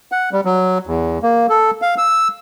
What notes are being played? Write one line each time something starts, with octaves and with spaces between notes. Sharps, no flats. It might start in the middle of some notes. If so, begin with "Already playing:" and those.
F#5
G3
F#3
E2
A#3
A4
F5
E6